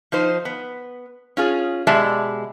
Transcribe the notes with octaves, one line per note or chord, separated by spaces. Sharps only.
F3 D#4 C5
B3
C#4 F4 G#4
B2 G#3 G4 D5 E5 A5